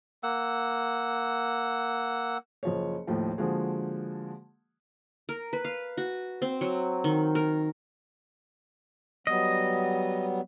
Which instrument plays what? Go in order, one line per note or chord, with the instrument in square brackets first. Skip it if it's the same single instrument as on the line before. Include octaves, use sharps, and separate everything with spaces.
[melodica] A#3 F#5 E6
[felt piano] F#1 F3 C#5
D#2 A2 F3
D3 F3 G#3 A#3 F#4 G#4
[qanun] A#4
B4
F5
F#4
C4
F#3
D#3
A#4
[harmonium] F#3 G3 B3 [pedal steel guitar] D#5